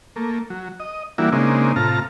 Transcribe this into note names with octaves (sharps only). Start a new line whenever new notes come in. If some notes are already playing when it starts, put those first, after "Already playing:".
A3 A#3
F#3
D#5
E3 G3 A#3 D4 E4 F#4
C#3 G#3 A#3 C4 D4 D#4
A2 C3 F4 A5 A#5 F6